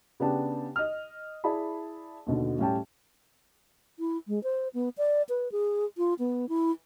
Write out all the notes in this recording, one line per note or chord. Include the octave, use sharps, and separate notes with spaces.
C#3 B3 D4 G4 A5
D#5 F6
E4 G#4 D5 A5 B5
D#2 B2 D3
A2 G3 C#4 G4 G5 A5
E4
G#3
C5
B3
D5
B4
G#4
F4
B3
E4